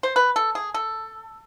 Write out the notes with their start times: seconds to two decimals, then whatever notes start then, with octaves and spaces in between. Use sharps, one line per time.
0.03 C5
0.16 B4
0.36 A4
0.55 G#4
0.74 A4